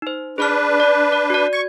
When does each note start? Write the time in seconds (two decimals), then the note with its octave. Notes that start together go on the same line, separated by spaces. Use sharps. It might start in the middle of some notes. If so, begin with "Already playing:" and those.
0.02 D#4 C5
0.38 D4 G#4 B4 D5 F6
0.80 D5
1.12 D5
1.30 F#4 D5
1.53 C#6 G#6